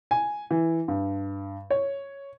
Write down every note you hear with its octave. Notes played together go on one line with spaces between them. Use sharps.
G#5
E3
G2
C#5